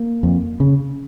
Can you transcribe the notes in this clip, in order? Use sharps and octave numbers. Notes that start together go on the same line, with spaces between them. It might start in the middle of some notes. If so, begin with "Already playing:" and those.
Already playing: A#3
F2
C#3